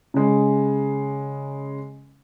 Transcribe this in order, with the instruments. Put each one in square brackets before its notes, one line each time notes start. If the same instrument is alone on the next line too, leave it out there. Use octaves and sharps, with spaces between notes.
[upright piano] C#3 G#3